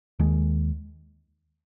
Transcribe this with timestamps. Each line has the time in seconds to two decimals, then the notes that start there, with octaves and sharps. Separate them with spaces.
0.19 D#2 D#3 G#3